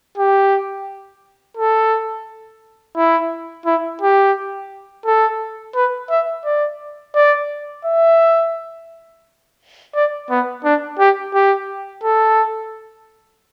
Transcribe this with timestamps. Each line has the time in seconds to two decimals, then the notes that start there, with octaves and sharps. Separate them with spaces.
0.17 G4
1.57 A4
2.97 E4
3.66 E4
4.01 G4
5.06 A4
5.75 B4
6.10 E5
6.45 D5
7.15 D5
7.85 E5
9.95 D5
10.30 B3
10.64 D4
10.99 G4
11.34 G4
12.04 A4